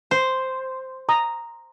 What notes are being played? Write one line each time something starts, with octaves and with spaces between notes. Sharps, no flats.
C5
A#5 D#6